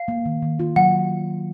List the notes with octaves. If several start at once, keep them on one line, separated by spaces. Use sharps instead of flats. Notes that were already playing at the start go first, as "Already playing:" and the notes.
Already playing: F5
A#3
D#3
D#3
F4
F#3 F#5